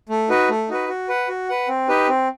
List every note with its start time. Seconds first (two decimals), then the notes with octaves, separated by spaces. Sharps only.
0.09 A3
0.29 D#4 F#4 B4
0.49 A3
0.69 D#4 F#4 B4
0.89 F#4
1.09 B4 F#5
1.28 F#4
1.49 B4 F#5
1.68 C4
1.88 D#4 G4 B4
2.08 C4